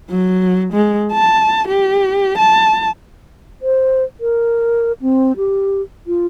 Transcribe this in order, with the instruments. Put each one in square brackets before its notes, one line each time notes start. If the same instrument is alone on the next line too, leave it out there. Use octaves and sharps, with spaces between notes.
[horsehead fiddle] F#3
G#3
A5
G4
A5
[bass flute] C5
A#4
C4
G4
F4